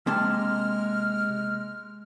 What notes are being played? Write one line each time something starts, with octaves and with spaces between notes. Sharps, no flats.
C3 G#3 A#3 A5 F6